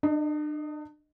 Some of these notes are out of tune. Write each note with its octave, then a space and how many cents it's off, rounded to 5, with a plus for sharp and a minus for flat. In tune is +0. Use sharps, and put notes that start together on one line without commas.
D4 +40 D#5 +0